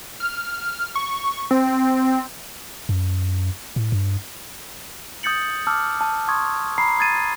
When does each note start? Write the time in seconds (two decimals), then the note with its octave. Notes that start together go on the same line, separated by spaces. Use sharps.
0.20 F6
0.95 C#6
1.51 C4
2.89 F#2
3.76 A2
3.92 G2
5.23 D#6 G6 A6 C#7 F#7
5.67 A5 D6 E6 F6
6.01 A5
6.28 C6 C#6 D#6 G#6
6.78 A#5 B5 C7
6.99 D#6 G#6 A6 D#7